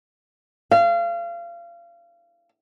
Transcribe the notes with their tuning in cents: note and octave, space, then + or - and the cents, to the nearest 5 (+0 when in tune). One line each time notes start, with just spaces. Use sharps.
F5 -30